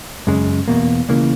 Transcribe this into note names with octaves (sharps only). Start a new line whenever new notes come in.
F#2 C#3 G#3
E2 B2 A#3
C#2 C#3 E3 A#3